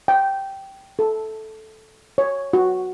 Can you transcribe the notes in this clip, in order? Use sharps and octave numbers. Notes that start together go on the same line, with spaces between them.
G5
A4
C#5
F#4